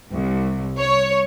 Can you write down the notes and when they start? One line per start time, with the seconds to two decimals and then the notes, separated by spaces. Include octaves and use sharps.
0.12 C2
0.79 C#5